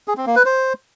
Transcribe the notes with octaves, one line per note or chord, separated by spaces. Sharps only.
G#4
C4
A#3
B4
C5